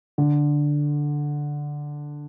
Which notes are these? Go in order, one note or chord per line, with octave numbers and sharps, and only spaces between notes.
D3